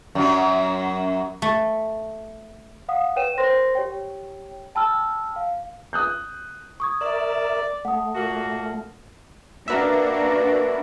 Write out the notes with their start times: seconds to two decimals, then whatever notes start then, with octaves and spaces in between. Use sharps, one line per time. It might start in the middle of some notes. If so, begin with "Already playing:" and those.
0.15 F#2 F#3
1.42 A3
2.89 F5 F#5 D#6
3.16 B4 C#5 G5 D#7 E7
3.38 A#4 C5 C6 A#6
3.75 G4 C#5 G5
4.75 G5 A5 B5 E6 F6
5.36 F5
5.93 D#6 F#6 G6
6.80 C#6 D#6 G#6
7.01 A#4 D5 E5
7.85 A3 F#5 D#6
8.15 A#2 A#3 F#4
9.68 A#3 D4 F#4 A#4 B4 E5